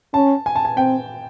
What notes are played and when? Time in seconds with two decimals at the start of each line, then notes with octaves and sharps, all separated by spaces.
0.14 C#4 A5
0.46 G#5
0.56 A5
0.65 G#5
0.77 C4 G5